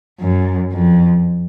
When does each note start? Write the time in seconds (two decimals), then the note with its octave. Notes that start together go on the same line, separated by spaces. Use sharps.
0.20 F#2
0.71 F2